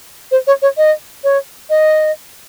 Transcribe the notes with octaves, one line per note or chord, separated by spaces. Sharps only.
C5
C#5
C#5
D#5
C#5
D#5